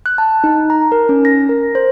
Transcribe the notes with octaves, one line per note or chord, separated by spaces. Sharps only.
F#6
A5
D#4
A#5
A#4
C#4
A#6
A#4
C5